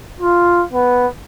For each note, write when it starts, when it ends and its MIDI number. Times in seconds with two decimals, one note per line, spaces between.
0.20 0.64 65
0.73 1.07 59